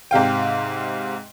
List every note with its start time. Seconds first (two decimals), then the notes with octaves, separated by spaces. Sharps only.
0.11 G#2 C3 F5 G5